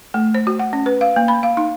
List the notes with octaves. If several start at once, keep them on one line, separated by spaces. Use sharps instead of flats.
A3
C5
F#4
F#5
C#4
B4
F5
A#3
B5
F5
D#4